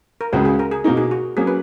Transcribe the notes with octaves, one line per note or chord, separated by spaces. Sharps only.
A#4
C#2 C#3 G#3 C#4 F#4 G#4
G#4
A#4
G#4
B2 A#3 D#4 A#4
G#4
F#4
F#3 A#3 C#4 G#4
B4